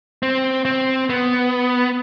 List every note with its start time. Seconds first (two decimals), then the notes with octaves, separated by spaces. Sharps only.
0.23 C4
0.65 C4
1.10 B3